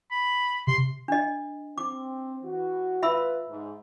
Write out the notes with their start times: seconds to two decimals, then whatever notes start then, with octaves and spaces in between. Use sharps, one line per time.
0.11 B5
0.67 C3 C6
1.08 D4 D#5
1.78 C4 D6
2.43 E3 F#4
3.03 F4 B4 E5 B5 E6
3.48 G#2